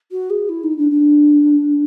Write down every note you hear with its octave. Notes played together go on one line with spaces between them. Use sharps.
F#4
G#4
E4
D#4
D4
D4